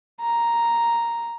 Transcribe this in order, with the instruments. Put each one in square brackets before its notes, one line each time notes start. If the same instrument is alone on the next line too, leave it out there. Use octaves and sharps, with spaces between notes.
[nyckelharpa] A#5